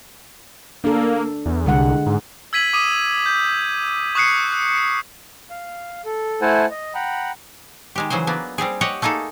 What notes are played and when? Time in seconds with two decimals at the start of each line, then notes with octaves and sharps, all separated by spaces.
0.84 A#3 D4 A4
1.46 E2
1.66 C2 D3 G#3 F#5
2.06 G#2
2.53 E6 G#6 B6 D#7 F#7
2.73 D6 D#6 D#7
3.26 G6
4.15 C#6 D#6 F#6 C7 C#7
4.53 F#6
4.78 C#7
5.50 F5
6.05 A4
6.42 A3 E4 C5 F#5 G#5 A5
6.71 D#5
6.95 F#5 G5 A#5 B5
7.96 D#3 G#3 G4
8.10 C#3 E3 F#3 G#4 C5
8.27 F#3 A#3 B3 D4
8.58 G3 C4 G4 G#4
8.81 G4 C#5 D#5 F#5
9.02 A3 A#3 D#4 G#4 A4